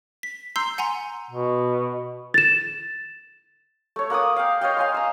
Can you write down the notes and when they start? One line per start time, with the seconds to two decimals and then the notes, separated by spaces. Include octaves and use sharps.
0.23 B6
0.56 A#5 C6 E6 G6 C7
0.78 F#5 G#5 A#5 C6
1.31 B2
2.34 A6 E7
3.96 A3 C#5
4.10 A#3 F#5 D6 D#6
4.36 F5 G5
4.61 C#5 D#5 F5 G5
4.77 F5 G#5 C6
4.94 A#5 E6